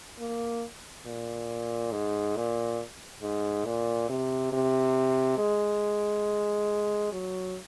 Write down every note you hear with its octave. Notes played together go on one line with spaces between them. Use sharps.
A#3
A#2
G#2
A#2
G#2
A#2
C3
C3
G#3
F#3